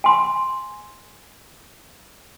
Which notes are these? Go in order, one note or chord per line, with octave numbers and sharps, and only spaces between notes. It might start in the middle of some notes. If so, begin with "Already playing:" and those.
G#5 C6